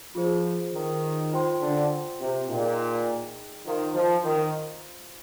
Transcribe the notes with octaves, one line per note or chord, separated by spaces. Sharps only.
F3 F4 G#4 C5
D#3
F4 C5 G5 C6
D3
C3
A#2 D#4 G#4 D#5 G5
D#3 F4 C5 F5 C6
F3
D#3